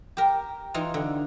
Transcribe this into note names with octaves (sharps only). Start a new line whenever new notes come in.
G4 A#4
E3 D#4 F4
D3